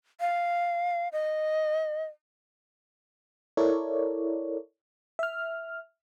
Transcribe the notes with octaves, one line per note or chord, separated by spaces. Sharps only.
F5
D#5
E4 A4 A#4 C#5 D5
E5 F6